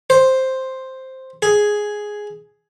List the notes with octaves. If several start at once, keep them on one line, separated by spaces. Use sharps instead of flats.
C5
G#4